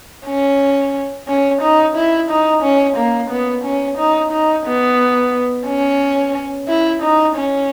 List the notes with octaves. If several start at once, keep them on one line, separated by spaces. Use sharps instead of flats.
C#4
C#4
D#4
E4
D#4
C#4
A#3
B3
C#4
D#4
D#4
B3
C#4
E4
D#4
C#4